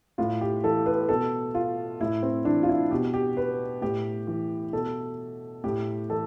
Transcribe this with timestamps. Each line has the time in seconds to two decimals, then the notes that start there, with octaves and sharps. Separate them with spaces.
0.18 A2 F4
0.41 G4
0.64 E3 A4
0.86 B4
1.09 B2 A4
1.55 F4
2.00 A2 E4
2.23 C4
2.45 E3 D4
2.63 F4
2.69 E4
2.91 B2 G4
3.14 G4
3.37 B4
3.82 A2 G4
4.27 E3
4.73 B2 A4
5.64 A2 G4
6.10 E3 A4